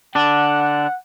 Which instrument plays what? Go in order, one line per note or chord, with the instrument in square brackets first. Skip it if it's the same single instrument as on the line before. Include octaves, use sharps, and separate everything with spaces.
[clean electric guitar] D3 D4 [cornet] F#5